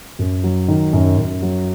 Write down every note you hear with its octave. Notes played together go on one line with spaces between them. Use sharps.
F#2
F#3
D#3
F#2
F#2
F#3